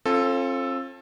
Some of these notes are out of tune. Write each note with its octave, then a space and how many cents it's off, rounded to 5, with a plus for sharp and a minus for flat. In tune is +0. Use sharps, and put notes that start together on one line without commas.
C4 +40 F4 +0 A4 +0